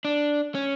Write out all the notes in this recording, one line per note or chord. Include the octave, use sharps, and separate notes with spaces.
D4
C#4